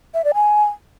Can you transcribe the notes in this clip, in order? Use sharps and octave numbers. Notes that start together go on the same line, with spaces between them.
E5
D5
G#5